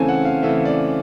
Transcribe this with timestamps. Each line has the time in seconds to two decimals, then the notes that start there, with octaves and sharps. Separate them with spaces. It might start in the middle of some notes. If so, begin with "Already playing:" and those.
Already playing: C#3 E3 A3 C4 G#5 A5
0.08 F#5
0.25 F5
0.42 C#3 E3 A3 C4 E5
0.65 D5